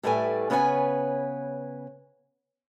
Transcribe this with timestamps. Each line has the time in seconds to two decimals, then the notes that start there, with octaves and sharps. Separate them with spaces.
0.03 A2 G3 A3 B4 G#5
0.50 C#3 B3 B4 C#5 D5 G#5